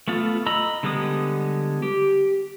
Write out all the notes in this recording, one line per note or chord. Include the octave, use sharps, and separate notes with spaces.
A3 B3 F4
D#5 A#5 B5 E6
D3 G3 G#3 B3 D#6
G4